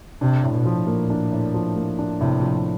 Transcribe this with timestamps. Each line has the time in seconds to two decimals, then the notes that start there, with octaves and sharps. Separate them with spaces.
0.21 C3 D4
0.44 A2
0.54 B2
0.66 F3
0.87 A#2 A#3
1.10 D4
1.32 A2
1.54 F3
1.76 A#3
1.99 D4
2.21 A2 C3
2.42 F3